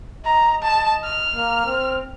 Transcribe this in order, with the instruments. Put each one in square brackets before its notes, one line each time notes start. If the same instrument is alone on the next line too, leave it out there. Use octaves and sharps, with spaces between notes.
[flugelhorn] D#5 [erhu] A#5
[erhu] A5
F6
[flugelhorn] A#3
C4